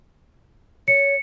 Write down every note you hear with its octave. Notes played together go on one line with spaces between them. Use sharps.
C#5 C#7